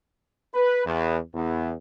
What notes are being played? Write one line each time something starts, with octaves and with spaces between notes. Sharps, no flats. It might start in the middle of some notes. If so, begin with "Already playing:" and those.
B4
E2
E2